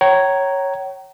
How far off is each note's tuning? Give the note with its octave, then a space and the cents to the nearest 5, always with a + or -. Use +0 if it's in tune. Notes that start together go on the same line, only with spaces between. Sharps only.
C#5 +0 G5 -40 A#5 +0